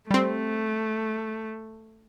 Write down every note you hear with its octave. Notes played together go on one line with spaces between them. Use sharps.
G3 A3 C4